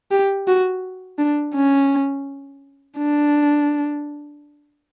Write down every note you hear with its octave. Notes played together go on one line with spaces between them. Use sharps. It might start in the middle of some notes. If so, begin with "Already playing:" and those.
G4
F#4
D4
C#4
D4